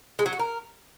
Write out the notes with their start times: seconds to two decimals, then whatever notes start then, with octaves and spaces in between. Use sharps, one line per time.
0.19 G#3
0.26 F#3
0.33 F#4
0.40 A#4